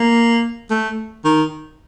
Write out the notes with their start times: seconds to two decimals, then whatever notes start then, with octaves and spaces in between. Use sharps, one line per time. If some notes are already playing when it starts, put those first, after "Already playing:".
Already playing: A#3
0.70 A3
1.24 D#3